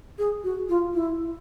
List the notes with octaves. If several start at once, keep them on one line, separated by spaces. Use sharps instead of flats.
G#4
F#4
F4
E4